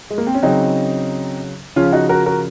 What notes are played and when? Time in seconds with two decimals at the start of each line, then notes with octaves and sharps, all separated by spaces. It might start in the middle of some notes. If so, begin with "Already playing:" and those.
0.10 G#3
0.18 A#3
0.27 C4
0.35 C#4
0.43 C#3 F#3 C4 D#4
1.76 C#3 F3 C#4 F4
1.92 D#4 F#4
2.09 F#4 A#4
2.26 F#4 A#4